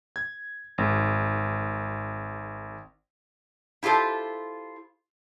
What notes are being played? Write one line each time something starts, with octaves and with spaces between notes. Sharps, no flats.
G#6
G#1
E4 F4 G4 A4 C5